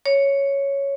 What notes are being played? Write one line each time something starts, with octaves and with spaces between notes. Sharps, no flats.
C#5